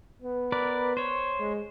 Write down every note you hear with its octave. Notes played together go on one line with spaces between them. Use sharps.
B3
A#4 B4 D5
C5 C#5
G#3